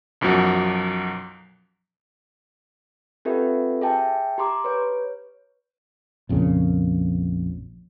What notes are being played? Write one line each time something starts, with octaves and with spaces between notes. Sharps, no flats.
B1 F#2 F3 F#3
C4 F4 G4 A4 B4 E5
G#4 E5 G5 A5
G4 A#5 C6 D6
B4 C#5
A#1 F2 A#2 C#3